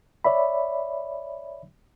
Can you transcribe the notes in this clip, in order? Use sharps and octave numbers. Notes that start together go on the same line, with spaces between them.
C#5 D5 E5 B5